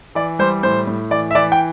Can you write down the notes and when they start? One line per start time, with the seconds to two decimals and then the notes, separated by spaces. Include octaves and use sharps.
0.15 E3 D5
0.39 G3 C5
0.63 A2 C5
0.87 A2
1.11 E3 D5
1.31 E5
1.35 E3 D5
1.52 G5